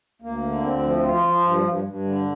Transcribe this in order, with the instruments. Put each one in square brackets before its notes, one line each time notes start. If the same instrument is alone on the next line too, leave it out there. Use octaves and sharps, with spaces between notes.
[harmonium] D2 A#3
D3
D2 C4
F3
F3 F4
F3
G2
G2
G2
D3